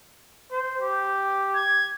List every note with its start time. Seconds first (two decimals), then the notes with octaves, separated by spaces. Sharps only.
0.51 C5
0.81 G4
1.55 G#6